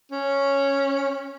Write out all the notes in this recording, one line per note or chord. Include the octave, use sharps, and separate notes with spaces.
C#4